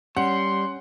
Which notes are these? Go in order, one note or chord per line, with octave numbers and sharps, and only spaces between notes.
G3 C#4 F#5 C6